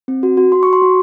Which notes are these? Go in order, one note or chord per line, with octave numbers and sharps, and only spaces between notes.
C4
F#4
F#4
F#4 C6
F#4 C#6
C6
F#4